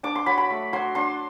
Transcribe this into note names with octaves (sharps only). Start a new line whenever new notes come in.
D4 D6
C6
F#3 B5
B5
A3
F#3 C6
D4 C6